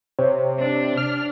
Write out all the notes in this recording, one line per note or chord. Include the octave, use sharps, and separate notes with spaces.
C3 C5 C#5
D4
F6